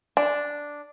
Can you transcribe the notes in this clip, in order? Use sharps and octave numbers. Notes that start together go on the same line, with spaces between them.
D4